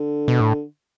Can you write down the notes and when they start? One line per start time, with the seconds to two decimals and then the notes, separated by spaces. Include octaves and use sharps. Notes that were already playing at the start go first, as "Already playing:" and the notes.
Already playing: D3
0.28 B2
0.40 A2